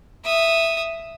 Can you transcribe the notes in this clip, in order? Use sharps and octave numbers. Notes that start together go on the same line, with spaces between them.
E5 D#6